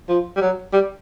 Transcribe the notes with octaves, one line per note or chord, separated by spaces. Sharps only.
F3
G3
F#3
G3